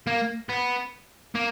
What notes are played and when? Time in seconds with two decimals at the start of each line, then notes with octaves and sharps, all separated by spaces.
0.07 A#3
0.49 B3
1.35 A#3